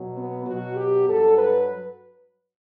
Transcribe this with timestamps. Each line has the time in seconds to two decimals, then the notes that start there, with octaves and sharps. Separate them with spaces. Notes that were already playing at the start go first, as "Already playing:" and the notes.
Already playing: B2 F#3
0.16 B3
0.46 B2 F#3 F#4
0.77 G4
1.07 G2 F#3 A4
1.38 B4